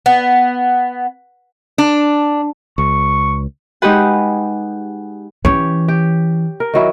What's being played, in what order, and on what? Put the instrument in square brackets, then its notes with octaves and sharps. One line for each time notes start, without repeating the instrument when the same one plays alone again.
[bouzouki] B3
[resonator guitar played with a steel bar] D4
[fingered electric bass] C#2 [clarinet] C#6
[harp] G#3 D#4 G4 G#4 B4 F#5
[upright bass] E3 C#4 [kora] G4 C#5
[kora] G4
A#4
D#3 F#3 E4